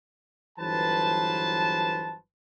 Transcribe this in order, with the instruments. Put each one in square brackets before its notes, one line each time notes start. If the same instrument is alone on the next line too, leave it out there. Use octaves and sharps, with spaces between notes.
[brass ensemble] G1 E3 F#3 B4 C5 A5